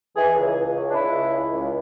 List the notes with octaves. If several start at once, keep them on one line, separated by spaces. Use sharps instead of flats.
E3 G#4
C#2
C#2
C#3
D4
C#2 E4
C#3
C#2
C#2